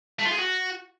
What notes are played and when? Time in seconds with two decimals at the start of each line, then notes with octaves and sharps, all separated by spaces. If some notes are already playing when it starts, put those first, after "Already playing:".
0.19 A3
0.25 F4
0.32 G#4
0.38 F#4